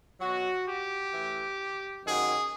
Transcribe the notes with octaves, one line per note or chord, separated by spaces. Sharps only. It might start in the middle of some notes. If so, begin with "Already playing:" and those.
B2 F#3 F#4
G4
A2 E3
F#2 D#3 F#3 G#4